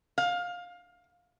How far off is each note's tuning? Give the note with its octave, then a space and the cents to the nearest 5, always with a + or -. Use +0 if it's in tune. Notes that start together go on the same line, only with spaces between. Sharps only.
F5 +20